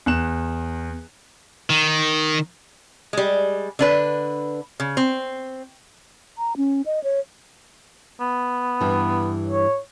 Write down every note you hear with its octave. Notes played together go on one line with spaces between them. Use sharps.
E2 F#6 E7
D#3
G3 G#3
D3 D4 B4
C#3
C4
A#5
C#4
D#5
C#5
B3
G2 E3
C#5